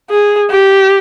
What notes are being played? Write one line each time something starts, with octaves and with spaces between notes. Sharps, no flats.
G#4
G4